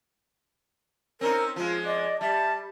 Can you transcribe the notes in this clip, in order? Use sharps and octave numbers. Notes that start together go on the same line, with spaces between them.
C4 C#4 D#4 A#4
F3 G#3 F4
D5 D#5
G3 E5 A5